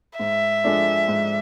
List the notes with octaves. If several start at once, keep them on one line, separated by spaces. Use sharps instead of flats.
G#2 E5
F3 G#3 D4 A4
G#2